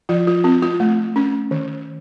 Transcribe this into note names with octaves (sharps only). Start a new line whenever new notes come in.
F3 F4
F4
C4 F4
F4
A3
C#4
D#3